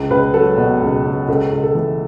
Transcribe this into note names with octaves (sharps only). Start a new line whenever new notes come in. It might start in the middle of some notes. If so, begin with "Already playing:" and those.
Already playing: C#2
C#2 B4
F#3 A4
B2
C#2
C#2
C#2 A4
C#2
A4
E3